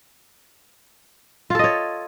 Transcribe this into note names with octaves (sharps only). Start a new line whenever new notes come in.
F4 A4 C#5 D#5